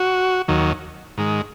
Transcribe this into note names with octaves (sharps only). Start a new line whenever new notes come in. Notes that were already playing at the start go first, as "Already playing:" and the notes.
Already playing: F#4
D#2 D#3 F#3
G#2 D#3 G#3